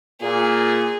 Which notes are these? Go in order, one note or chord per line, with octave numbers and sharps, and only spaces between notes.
A#2 G#4